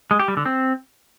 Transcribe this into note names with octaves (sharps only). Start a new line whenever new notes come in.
G#3
G4
G3
D3
C4